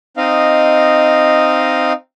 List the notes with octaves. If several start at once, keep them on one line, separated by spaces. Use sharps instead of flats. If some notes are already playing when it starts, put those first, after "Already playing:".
C4 D#4 D#5 F5